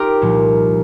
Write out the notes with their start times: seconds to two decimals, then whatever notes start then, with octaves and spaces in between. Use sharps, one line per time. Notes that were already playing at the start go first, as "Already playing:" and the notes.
Already playing: D#4 F4 G4 A#4
0.21 C2 A#2 F3